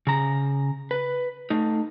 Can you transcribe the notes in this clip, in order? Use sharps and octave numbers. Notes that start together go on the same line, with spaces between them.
C#3 A#5
B4
A3 D#4